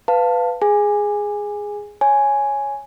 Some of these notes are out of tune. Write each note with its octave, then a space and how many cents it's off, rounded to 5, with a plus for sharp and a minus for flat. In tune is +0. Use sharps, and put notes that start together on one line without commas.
B4 +10 F5 +0 A5 +15
G#4 +0 G#5 -10
C#5 +0 G#5 +5